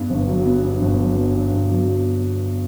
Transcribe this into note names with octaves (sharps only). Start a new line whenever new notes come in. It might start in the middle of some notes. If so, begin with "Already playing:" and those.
Already playing: G2 B3
G1
F#3
B3
G2
G1
F#3
B3
G2
G1
F#3
B3